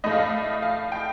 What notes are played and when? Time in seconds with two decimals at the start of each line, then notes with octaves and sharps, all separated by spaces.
0.04 A2 A3 D#5
0.11 F5
0.19 D#5
0.62 F5
0.92 G5